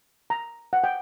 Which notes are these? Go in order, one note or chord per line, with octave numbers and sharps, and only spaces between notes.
A#5
F#5
G5